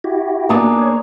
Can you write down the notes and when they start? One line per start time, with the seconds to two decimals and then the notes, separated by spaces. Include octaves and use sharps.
0.04 E4 F#4 G4
0.49 A#3 B3 D4 D#4 G#4
0.79 C#5